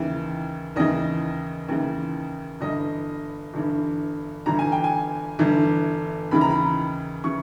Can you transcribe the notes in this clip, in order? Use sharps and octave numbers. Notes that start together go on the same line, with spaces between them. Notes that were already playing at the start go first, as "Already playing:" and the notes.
Already playing: D#2 C#3 E3
D#2 C#3 E3 D#5
D#2 C#3 E3
G1 G2 E3 D#5
G1 G2 E3
G1 G2 E3 A#5
G#5
G5
G#5
G1 G2 E3
D#2 C#3 E3 B5
A#5
B5
C#3 E3 C#6